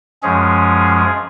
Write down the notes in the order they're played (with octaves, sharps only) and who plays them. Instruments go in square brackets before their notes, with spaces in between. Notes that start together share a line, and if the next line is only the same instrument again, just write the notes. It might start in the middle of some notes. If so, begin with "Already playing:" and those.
[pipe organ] F#2 F3 G#3 C#4 G#4